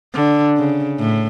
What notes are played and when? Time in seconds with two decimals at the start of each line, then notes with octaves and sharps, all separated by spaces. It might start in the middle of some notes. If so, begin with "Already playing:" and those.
0.14 D3
0.56 C#3
0.99 A2